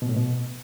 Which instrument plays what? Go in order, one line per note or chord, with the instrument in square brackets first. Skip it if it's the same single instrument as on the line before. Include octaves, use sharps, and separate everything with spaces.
[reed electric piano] B2
A2
B2